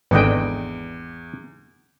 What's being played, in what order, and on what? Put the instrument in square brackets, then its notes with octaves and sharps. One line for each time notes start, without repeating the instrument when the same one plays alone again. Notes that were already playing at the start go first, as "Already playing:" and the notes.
[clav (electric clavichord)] G#1 D3 [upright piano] E2 D6 [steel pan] B4 D#5 G5